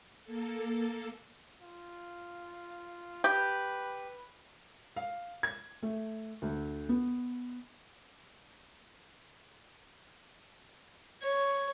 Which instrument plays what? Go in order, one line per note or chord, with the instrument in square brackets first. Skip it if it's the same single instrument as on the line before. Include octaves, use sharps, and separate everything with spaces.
[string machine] A#3 A4
[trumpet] F4
[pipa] G4 [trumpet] B4
[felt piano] F5
G#6
A3
D2
B3
[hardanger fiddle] C#5